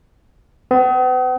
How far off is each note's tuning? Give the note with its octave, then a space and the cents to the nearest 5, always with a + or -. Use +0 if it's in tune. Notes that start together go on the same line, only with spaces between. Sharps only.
B3 +45